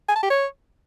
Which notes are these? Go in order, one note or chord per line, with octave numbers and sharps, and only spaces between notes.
G#5
A5
G4
C#5